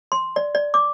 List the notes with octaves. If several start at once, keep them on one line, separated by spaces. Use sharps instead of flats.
C6
D5
D5
D6